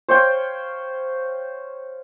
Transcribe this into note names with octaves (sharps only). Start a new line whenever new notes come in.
C5 C#5 F5 G5